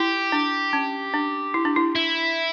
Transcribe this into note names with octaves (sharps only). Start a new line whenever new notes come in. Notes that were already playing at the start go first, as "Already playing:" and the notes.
Already playing: E4 G4
D4
C#4
D4
E4
D4
E4
E4